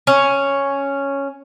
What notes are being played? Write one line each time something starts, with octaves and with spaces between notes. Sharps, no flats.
C#4